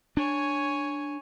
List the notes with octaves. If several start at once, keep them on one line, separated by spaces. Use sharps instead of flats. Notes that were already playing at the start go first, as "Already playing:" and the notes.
D4 C#5 G#5